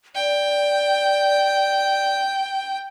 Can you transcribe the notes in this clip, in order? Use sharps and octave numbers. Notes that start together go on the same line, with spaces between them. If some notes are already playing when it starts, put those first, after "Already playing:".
D5 G5